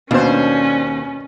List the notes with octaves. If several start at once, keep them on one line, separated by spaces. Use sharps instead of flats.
D#2 B2 C#4 D4 C5